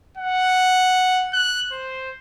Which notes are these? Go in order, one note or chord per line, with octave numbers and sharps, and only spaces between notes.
F#5
F#6
C5